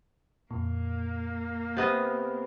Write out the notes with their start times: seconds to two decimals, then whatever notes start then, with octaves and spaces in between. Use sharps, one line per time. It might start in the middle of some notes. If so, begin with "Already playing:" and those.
0.51 F2 A#2 A#3
1.77 C3 B3 D#5